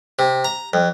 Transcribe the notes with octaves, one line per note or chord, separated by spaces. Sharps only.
C3
A#5
F2